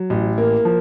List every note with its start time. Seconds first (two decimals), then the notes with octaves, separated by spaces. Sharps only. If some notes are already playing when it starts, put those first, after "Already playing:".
Already playing: F#3
0.10 A1
0.38 A#3
0.65 F3